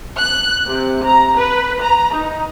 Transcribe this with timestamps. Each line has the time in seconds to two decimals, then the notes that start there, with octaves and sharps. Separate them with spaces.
0.18 F#6
0.66 C3
1.04 A#5
1.38 B4
1.82 A#5
2.11 D#4